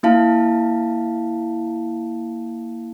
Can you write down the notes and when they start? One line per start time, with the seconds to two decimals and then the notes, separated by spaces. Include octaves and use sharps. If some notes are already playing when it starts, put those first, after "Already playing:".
0.03 A#3 E4 F5 A5